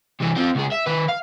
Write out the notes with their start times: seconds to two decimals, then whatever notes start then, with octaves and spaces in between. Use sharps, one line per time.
0.20 C3 E3
0.36 C4 F4
0.55 C#2 G#4
0.72 E5
0.86 D#3 B4
1.08 F5